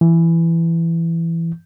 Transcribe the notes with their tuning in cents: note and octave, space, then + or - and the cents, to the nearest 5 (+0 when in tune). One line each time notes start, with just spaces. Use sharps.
E3 +15